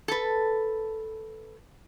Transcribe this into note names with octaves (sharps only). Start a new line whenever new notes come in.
A4 B4